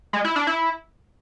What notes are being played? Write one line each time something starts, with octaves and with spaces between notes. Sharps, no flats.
G#3
E4
D4
E4